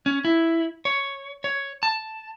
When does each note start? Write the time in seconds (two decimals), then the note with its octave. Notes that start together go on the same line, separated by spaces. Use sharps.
0.06 C#4
0.25 E4
0.85 C#5
1.44 C#5
1.83 A5